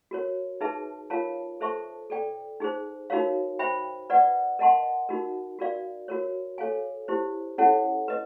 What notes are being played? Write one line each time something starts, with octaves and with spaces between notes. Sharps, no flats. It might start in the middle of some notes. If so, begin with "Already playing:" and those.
F#4 A#4 C#5
D#4 G#4 B4 E5 A5
F4 A#4 C#5 F5 A5
A4 C5 E5 A5 C#6
A4 D5 G5
D#4 G#4 C5
D#4 F#4 A#4 C#5 F5
C5 E5 G5 B5
B4 D5 F#5
A#4 D#5 F#5 A5 C6
D#4 F#4 A#4
F#4 A#4 D5 F5
F#4 A#4 C#5
A4 C#5 F5 G#5
E4 G4 C5
C#4 E4 A4 C#5 F#5
B4 D#5